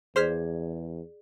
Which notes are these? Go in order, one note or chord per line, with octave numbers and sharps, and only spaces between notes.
E2 G#4 C5 D5 F6 B6